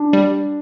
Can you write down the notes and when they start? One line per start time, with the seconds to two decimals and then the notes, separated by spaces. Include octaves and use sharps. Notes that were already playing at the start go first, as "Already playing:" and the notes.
Already playing: D4
0.13 G3